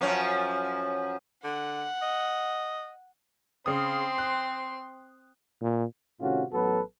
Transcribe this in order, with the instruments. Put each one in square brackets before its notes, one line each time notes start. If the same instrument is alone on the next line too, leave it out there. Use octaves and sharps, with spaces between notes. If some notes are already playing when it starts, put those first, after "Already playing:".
[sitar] F#2 F3 C#4
[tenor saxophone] D3 [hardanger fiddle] F#5
[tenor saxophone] D#5
[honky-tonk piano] C#3 D#6 [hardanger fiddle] C4 C6
[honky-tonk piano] F#6
[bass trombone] A#2
[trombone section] A2 C3 D#3 C#4 F4 F#4
A1 F#3 B3 F#4 A4 B4